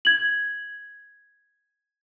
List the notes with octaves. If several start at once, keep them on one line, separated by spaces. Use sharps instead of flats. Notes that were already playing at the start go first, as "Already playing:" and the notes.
G#6 F#7